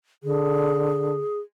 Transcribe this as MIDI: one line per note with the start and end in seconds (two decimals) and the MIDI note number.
0.23 1.19 50
0.23 1.39 68